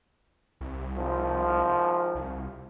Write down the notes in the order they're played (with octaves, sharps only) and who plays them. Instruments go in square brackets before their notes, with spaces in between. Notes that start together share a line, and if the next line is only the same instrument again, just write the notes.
[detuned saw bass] C2
[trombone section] G#1 F3
[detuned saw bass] C2